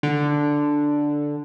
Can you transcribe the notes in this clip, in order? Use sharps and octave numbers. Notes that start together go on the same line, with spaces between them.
D3